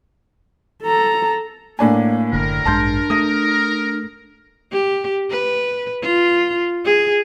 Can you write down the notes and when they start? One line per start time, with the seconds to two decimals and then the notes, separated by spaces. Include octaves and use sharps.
0.83 A4 A#5
1.79 A2 A#3 D4 G#5
2.33 F#1 D3 A#4
2.65 A1 G2 G#3 D4 A5 C6 G6
3.10 A3 D#6 A#6
4.72 G4
5.30 B4
6.02 F4
6.85 G#4